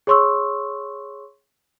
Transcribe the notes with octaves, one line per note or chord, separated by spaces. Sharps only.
G#4 C#5 C6 C#6 E6